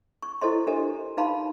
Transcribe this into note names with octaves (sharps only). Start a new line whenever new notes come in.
C#6
E4 A4 C5 D#5 C6
D4 G4 A4 A#4 C5 D#5
D#4 B4 F5 A5 B5 C6